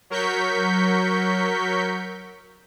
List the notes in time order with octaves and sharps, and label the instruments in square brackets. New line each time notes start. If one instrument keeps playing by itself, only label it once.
[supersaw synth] F#3 A#4 C#6 G6 B6